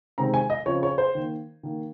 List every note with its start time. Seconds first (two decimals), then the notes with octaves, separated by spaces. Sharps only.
0.18 C3 D#3 G#3 C4 A#5
0.34 G#5
0.50 D#5
0.66 C#3 F3 C4 C#5
0.83 C#5
0.98 C5
1.15 D#3 A#3
1.63 D#3 A#3